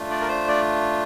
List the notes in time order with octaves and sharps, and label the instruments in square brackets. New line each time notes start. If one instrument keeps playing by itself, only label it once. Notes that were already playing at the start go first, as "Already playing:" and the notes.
Already playing: [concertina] A3 D4 F4
D5
A#4
C5
D5